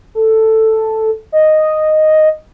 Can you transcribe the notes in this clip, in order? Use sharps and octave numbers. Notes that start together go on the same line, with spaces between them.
A4
D#5